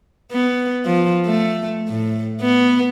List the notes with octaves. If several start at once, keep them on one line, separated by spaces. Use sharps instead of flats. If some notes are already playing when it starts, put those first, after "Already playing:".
B3
F3
A3
A2
B3